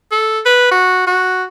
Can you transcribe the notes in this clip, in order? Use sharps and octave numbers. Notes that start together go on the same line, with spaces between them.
A4
B4
F#4
F#4